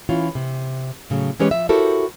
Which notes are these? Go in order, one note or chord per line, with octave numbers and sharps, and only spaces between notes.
E3 C#4 E4 F4
C3
A2 C#3 F#3
E3 G#3 C#4 G4 B4 C#5
F3 E5
E4 F#4 G4 A4 A#4 C5